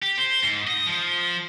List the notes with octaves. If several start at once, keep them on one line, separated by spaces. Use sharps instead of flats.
G4
C5
G#2
D#5
F3